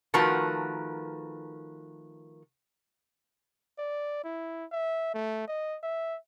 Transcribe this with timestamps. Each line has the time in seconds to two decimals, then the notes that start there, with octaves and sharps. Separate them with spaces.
0.14 D#3 F3 A3 F#4 A#4 B4
3.78 D5
4.24 E4
4.72 E5
5.14 A3
5.48 D#5
5.83 E5